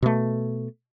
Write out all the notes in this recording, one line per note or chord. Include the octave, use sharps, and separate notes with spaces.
B2 A3